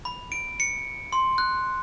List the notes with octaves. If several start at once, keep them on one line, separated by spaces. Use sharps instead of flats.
B5
D7
C#7
C6
F#6